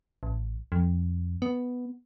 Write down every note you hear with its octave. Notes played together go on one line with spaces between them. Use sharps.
A1
F2
B3